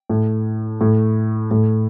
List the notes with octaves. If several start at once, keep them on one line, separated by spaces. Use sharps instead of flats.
A2
A2
A2